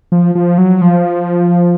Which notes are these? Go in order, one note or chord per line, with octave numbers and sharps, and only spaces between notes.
F3
F3
F#3
F3